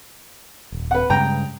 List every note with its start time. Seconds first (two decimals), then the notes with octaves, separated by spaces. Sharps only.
0.72 D#1
0.91 B4 F#5
1.10 G2 C#3 G#3 G5 A#5